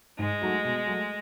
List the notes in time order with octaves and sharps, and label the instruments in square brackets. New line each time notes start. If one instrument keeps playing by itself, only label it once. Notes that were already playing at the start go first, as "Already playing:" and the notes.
[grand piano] G#2 [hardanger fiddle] G#3
[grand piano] F#3 A3 D#4 F#4
B2
F#3 A3